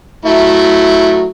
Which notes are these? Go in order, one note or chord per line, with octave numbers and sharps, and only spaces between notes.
F#3 A3 E4